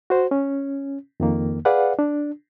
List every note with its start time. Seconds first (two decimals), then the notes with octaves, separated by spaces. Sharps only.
0.10 F#4 C5
0.31 C#4
1.20 F2 D#3 A#3
1.65 G#4 B4 D5 F5 F#5
1.99 D4